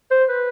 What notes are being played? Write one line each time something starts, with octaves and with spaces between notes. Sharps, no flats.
C5
B4